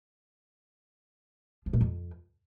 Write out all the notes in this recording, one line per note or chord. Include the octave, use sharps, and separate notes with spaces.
F3
A#2
F2